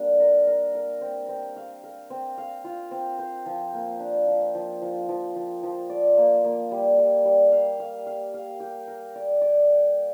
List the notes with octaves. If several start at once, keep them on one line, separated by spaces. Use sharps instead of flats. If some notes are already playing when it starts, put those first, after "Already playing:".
Already playing: G3 A#3 C4 D4
A#4
A#4
A#4
C4
C4
F5
A#4
C4
F5
F4
C4
C5
F3
A#3
D4
F3
F3
F3
F3
F3
F3
D5
A#3
A#3
G3
G3
G3
F5
F5
F5
F5
G4
A#4
D5
D5